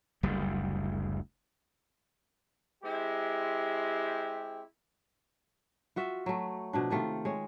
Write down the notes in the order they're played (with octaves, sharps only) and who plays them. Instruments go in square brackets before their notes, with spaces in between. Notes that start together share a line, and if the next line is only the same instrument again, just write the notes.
[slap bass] F#1 D2 G3
[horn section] G#3 C4 E4 G4
[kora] F4 F#4 E5
F#3 A3
B2 F3 D4
C3 D#3 A3 F4
G#3 C#5